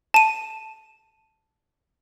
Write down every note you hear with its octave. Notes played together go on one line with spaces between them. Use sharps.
A5 D#7